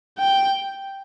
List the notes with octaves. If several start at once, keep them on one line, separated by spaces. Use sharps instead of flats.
G5